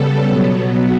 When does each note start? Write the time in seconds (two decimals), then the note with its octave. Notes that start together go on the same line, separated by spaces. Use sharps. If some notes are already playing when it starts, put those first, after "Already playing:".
Already playing: C#3 G3 B3 A4
0.26 B2 F#3 B3